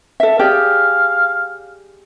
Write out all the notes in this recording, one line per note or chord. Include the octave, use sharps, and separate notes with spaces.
A4 E5
G4 G#4 D5 F5